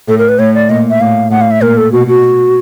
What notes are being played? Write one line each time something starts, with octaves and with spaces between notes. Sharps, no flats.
A2 A4
A#4
B4
A2 C#5
D5
A#2 D#5
E5
A2 F5
A2 F#5
F5
E5
A#2 A#4
A4
B2 F#4
F#4